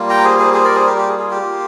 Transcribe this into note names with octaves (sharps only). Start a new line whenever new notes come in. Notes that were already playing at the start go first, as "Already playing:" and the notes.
Already playing: G3 A#3 F4
G5 A#5
G#4 C5
G#4 C5
G#4 C5
A#4 D5
G#4 C5
G4 A#4
G4
G#4
G#4
G4
A#3 F4